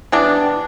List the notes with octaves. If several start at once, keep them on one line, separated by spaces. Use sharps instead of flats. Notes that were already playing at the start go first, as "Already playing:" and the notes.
E3 G3 B3 D4